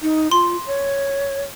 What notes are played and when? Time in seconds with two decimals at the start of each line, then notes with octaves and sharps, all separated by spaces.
0.02 D#4
0.31 F4 C6
0.66 C#5